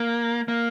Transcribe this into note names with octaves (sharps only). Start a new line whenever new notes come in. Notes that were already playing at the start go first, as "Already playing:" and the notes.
Already playing: A#3
A#3